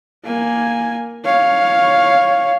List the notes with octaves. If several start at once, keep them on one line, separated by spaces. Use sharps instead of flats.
A#3 G#5
C#5 F5